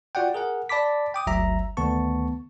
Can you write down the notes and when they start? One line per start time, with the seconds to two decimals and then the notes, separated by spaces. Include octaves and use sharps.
0.15 F4 F#4 D5 F#5 G5
0.34 G#4 A#4 F#5
0.69 D5 A5 B5 D6 B6
1.14 G5 D6 D#6
1.27 G1 D2 F#3 E5 A#5
1.77 D2 D#3 A3 B3 A5 C#6